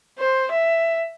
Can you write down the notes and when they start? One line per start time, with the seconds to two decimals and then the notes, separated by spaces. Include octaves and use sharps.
0.18 C5
0.52 E5